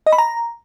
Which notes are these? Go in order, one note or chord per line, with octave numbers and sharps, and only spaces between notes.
D#5
B5
A#5